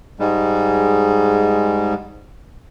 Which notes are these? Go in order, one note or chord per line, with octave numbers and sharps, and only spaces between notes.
G#2 G3 G#3